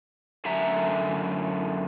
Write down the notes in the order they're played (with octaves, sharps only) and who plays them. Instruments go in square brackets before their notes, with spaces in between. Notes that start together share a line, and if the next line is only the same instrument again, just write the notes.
[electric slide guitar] F#2 D3 A3 E5 A#5